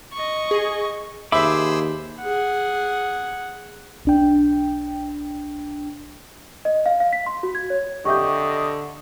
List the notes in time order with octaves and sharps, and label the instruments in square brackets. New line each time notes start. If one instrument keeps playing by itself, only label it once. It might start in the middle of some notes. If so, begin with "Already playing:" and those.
[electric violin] D#5 C#6
[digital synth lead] G#4
[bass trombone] D#2 [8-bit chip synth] G#4 C5 E6 [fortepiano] E5 [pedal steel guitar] B5 D6
[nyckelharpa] G#4 F#5
[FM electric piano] B1 D4 G5
[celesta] D#5
F5
F5
B6
C6
F#4
G#6
C#5
[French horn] D3 [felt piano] G4 E5 G6 [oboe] D#5 [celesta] C#6